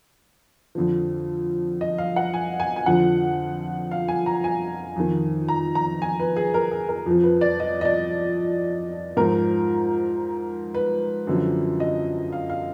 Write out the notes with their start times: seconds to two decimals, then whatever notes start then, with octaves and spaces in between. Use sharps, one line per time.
0.75 F2 D3 F3
1.81 D#5
1.98 F5
2.16 F#5
2.34 G#5
2.60 G#5
2.76 G#5
2.86 F2 D3 F3 F#5
3.91 F5
4.08 G#5
4.26 A#5
4.44 G#5
4.96 F2 D#3
5.48 A#5
5.75 A#5
6.02 G#5
6.20 B4
6.36 G#4
6.54 A#4
6.71 G#4
6.89 A#4
7.06 F2 F3
7.23 B4
7.41 D5
7.60 D#5
7.81 D#5
7.85 D5
9.17 G#2 F3 A#4
10.75 B4
11.27 F#2 D3 F3
11.80 D#5
12.32 F5
12.50 F5